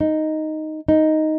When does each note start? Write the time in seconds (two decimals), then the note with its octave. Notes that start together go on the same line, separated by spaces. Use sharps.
0.01 D#4
0.88 D#4